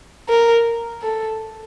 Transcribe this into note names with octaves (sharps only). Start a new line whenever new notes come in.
A#4
A4